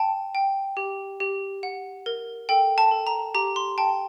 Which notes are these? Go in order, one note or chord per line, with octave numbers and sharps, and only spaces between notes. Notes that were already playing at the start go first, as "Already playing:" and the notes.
Already playing: G5 A5
G5
G4
G4
F#5
A#4
A4 G5
A5
A4
A#5
G4 A#5
C6
G5 A5